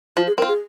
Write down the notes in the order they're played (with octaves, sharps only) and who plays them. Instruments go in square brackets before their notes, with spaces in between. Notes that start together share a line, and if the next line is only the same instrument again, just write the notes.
[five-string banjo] F3 [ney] F4
[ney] G#4
[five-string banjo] C4 F4 [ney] A#4
[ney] G#4